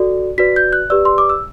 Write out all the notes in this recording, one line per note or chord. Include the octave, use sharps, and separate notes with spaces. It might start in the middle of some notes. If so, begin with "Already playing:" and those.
Already playing: F#4 A4 D5
F#4 B4 D5 B6
G6
F#6
G4 B4 D5 E6
C6
D6
E6